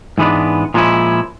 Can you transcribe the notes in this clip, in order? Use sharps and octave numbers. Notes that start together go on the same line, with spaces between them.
G#2 E3 G#3 B3 D4
A#2 F3 G#3 C#4 E4